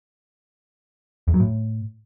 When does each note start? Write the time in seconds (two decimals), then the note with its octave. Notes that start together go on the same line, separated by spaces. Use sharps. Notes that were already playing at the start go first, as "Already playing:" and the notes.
1.28 E2
1.34 F#3
1.40 A2